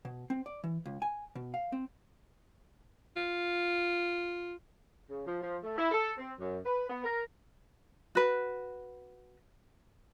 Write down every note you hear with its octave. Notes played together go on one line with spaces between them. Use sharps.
B2
C4
D5
E3
C#2
G#5
B2
F5
C4
F4
C#3
F3
F3
A3
E4
A4
C4
F#2
B4
B3
A#4
F#4 B4